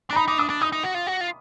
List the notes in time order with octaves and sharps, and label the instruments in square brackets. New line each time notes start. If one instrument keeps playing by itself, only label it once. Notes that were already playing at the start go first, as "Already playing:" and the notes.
[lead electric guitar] D4 [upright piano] A#5
[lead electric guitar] D#4 [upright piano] B5
[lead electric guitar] D#4 [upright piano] D6
[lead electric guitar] D4 [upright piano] D#6
[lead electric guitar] D4
[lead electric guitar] D#4 [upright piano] D#6
[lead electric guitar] D#4
F#4
F4
F#4
F4